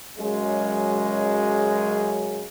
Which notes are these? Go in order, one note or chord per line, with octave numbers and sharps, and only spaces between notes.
F#2 C#3 F#3 G#3